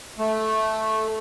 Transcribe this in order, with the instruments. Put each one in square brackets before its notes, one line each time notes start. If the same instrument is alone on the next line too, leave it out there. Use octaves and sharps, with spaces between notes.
[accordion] A3